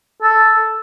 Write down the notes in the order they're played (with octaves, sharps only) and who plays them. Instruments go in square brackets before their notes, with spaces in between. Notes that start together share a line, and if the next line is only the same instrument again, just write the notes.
[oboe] A4